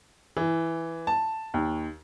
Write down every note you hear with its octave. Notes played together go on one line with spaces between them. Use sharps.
E3
A5
D#2